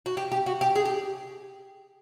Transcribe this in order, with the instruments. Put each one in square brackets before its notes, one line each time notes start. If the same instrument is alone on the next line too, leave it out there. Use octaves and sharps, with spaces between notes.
[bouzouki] F#4
G4
G4
F#4
G4
G#4
G4